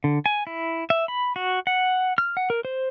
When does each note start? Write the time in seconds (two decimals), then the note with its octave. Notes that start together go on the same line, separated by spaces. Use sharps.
0.04 D3
0.26 G#5
0.47 E4
0.90 E5
1.08 B5
1.36 F#4
1.67 F#5
2.18 F6
2.37 F#5
2.50 A#4
2.65 C5